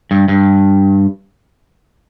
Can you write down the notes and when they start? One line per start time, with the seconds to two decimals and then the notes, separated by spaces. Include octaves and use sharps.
0.11 G2
0.28 G2